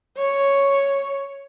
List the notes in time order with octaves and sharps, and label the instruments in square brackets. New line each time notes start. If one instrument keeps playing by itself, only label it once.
[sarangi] C#5